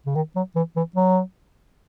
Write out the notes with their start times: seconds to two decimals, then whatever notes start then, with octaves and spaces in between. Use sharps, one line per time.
0.06 C#3
0.15 D#3
0.36 F#3
0.55 E3
0.76 E3
0.96 F#3